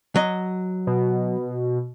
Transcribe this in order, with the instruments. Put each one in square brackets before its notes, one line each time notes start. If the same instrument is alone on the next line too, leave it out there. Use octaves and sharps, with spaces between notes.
[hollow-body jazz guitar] F#3 D#5
[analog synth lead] B2